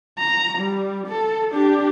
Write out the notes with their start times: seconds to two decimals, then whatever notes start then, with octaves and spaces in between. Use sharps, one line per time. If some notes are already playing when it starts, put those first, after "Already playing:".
0.19 A#5
0.58 G3
1.07 A4
1.51 D4 G4